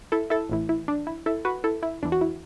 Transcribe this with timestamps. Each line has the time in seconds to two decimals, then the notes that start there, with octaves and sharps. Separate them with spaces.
0.12 E4 A4
0.30 E4 A4
0.50 A1 A2 E3
0.69 E4
0.88 D4
1.07 E4
1.26 E4 A4
1.45 F#4 B4
1.64 E4 A4
1.83 E4
2.02 E2 D4
2.05 E3
2.12 F#4
2.21 E4